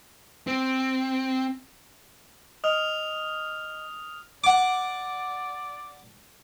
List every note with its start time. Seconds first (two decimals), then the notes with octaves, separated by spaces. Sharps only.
0.47 C4
2.64 D#5 D#6 F6 F7
4.44 D5 F#5 D6